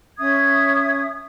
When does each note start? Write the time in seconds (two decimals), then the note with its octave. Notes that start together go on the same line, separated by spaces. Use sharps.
0.18 C#4 E5 D#6 G#6